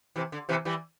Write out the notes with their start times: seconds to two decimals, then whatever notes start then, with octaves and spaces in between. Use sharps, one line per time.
0.16 C3 E3
0.32 D3
0.49 C3 E3
0.65 E3 G3